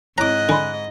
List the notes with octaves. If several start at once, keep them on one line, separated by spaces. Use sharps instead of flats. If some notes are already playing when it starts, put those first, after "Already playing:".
G#2 C4 E4 C#5 D#5 A#5 D6 F#6
D3 G#5 B5 C6